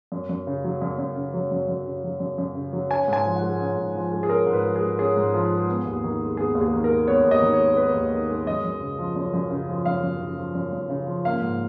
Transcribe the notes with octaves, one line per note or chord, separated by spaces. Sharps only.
F#2
F#2
C#3
F#3
F#2
F#2
C#3
F#3
F#2
F#2
C#3
F#3
F#2
F#2
C#3
F#3
C#4 G#5
G#2
G#5
F3
F#5
G#3
C#4
G#2
F3
G#3
G#4
C#4 A#4
G#2
B4
F3
G#4
G#3
C#4 G#4
G#2
F3
G#3
B3
D#2
D#3
G#3
B3 G#4
D#2
G#4
D#3
A#4
G#3
B3 C#5
D#2
D#5
D#3
C#5
G#3
B3 B4
D#2
D#3
G#3
F#2 D#5
F#2
C#3
F3
F#2
F#2
C#3
F3
F#2 F5
F#2
C#3
F3
F#2
F#2
C#3
F3
A#3 F5
G#2